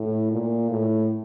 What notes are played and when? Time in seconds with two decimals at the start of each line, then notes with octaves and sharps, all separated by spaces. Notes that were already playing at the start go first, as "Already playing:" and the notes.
Already playing: A2
0.31 A#2
0.70 A2